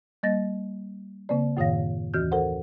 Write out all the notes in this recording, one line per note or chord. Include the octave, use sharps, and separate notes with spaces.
G3 A#3 D#5 A6 A#6
C#3 A#3 C4 D5
F#2 A2 D#3 C#5 F5 A#6
D#2 E3 F#4 F6 G6
A4 A#4 C5 F#5